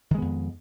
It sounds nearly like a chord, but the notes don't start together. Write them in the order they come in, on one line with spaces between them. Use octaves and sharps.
D#3 G#3 B3 F2